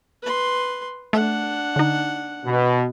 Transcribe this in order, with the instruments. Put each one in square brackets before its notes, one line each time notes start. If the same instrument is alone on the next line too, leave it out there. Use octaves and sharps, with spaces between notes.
[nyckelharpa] B4 C6
[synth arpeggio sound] A3 [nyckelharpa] D4 F#5
[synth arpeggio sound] D3 D#4
[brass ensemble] B2